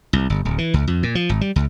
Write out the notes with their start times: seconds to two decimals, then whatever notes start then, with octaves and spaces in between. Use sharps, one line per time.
0.13 C2
0.30 G1
0.45 D1
0.58 E3
0.74 C#2
0.87 F2
1.03 A#2
1.15 F3
1.29 G#1
1.41 G3
1.56 C#2